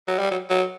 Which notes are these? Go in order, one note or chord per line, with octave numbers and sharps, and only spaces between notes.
F#3
G3
F#3
F#3